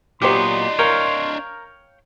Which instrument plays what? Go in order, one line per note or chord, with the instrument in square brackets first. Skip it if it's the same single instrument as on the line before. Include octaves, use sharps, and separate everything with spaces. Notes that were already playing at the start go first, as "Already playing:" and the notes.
[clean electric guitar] A#2 F#3 B3 [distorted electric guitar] D4 D#5 [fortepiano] G4 C5 [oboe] C6
[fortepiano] A#4 [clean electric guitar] C#5 F5 G5